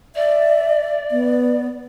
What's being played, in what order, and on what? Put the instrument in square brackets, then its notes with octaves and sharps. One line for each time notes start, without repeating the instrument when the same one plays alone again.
[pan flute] D5 [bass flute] E5
[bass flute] B3